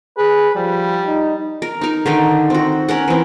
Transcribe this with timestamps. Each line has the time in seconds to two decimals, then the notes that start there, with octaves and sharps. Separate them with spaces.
0.17 G#4 B4
0.55 F3 G3
1.05 D#4
1.62 A#4
1.81 D#4 A#4
2.06 D3 D#3 D#4
2.50 C4 F#4
2.88 C#4 A#4 F#5
3.08 E3 C4